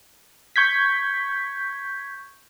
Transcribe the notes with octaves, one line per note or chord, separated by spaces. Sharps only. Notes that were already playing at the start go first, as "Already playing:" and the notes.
C#6 G6 G#6 B6